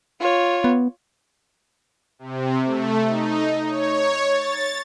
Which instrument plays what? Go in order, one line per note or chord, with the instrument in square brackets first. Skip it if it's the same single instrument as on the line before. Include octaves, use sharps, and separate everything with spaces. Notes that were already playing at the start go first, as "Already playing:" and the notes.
[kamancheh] F4 C#5
[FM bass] B3
[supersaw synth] C3
A3
D#4
C#5
A6